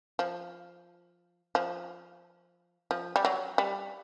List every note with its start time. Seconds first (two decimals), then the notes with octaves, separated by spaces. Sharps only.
0.19 F3
1.55 F3
2.91 F3
3.16 G3
3.25 F#3
3.58 G3